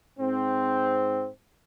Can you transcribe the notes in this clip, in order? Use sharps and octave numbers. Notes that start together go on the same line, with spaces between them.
G#2 C4